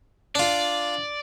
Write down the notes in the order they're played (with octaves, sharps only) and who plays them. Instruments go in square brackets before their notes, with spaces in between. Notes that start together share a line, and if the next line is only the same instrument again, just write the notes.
[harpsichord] D4 F4 [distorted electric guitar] D5